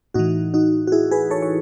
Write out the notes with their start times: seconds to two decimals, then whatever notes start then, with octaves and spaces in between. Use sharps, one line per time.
0.14 A2 E3 D#4 F#4
0.54 D#4 F#4
0.87 F#4
0.92 E4 G#4
1.11 G#4 B4
1.31 A4 C#5
1.42 C#5